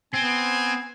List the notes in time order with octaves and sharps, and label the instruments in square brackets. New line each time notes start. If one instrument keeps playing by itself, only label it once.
[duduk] B3 [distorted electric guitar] C4 [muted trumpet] G#5